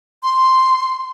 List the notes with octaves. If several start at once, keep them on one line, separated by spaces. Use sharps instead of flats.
C6